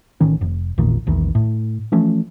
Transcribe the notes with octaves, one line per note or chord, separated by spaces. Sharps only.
A1 D#3 C#4
F1
A1 E2 A#2 D#3
A#1 E2 D#3 E3
A2
E3 F3 A3 C#4